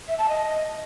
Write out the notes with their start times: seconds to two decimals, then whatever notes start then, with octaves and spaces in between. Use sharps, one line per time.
0.08 E5
0.18 A5
0.29 D#5